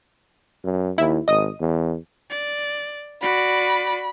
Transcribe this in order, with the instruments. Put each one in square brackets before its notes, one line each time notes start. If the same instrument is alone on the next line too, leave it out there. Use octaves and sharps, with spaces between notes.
[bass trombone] F#2
[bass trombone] D#2 [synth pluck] E4
[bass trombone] G#1 [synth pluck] D#5 D#6 D#7
[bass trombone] E2
[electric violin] D5
[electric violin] F#4 [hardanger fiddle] D5 [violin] B5